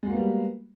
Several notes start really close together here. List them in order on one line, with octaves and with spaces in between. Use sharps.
G#3 F#4 A#3 B3 G3